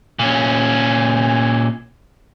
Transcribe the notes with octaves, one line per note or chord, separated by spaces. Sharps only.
A#2 C#4